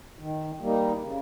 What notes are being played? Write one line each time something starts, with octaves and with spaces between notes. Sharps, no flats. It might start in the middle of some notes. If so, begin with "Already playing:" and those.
D#3
G3 A#3 D#4
C#3